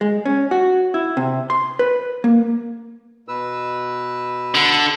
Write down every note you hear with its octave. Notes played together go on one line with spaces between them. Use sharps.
G#3
C#4
F#4
E4
C3
C6
B4
A#3
B2 B4 E6
D3